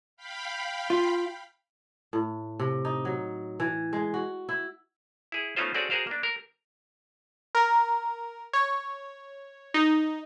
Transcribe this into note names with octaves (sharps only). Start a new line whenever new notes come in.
F5 G5 B5
F4
A2
C3
D#4
F#3
E3
G#3
F#4
E4
E4 G#4
A3 B3 C#4 D#4 F4 C5
C4 C#4 F#4 G#4 A4 D5
F#4 G#4 A#4 C5 F5
A#3 D4
A#4
A#4
C#5
D#4